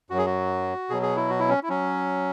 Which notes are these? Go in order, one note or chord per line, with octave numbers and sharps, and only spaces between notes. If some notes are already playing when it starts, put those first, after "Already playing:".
F#2 F#3 F#4 G#4
F#4
B2 F#3 G#4
G#4
E4
F#4
E4
C#4
E4
F#3 C#4